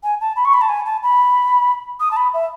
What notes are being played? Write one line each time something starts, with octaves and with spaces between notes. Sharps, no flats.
G#5
A5
B5
C#6
B5
A5
G#5
A5
B5
D#6
A5
B5
E5